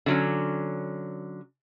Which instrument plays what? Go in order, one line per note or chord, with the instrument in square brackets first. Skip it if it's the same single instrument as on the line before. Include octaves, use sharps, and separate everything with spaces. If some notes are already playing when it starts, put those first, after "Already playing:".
[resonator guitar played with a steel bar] D3 F#3 C#4